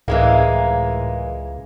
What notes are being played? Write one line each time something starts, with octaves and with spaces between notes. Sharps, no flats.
C#2 A2 E3 G#3 A#3 F5